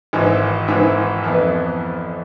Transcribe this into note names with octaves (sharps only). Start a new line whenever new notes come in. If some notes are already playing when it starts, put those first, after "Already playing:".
G#1 G#2 E3
G#1 G#2 E3
F2 E3 B3